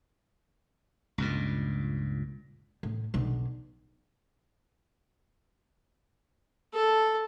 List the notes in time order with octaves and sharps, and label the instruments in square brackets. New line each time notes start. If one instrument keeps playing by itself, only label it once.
[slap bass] C#2 G2 A#2
[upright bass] A2
B1 D3
[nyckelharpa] A4